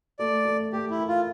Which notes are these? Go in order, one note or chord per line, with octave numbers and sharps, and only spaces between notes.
A3 D5
A3
A3 G4
E4
A#4
F4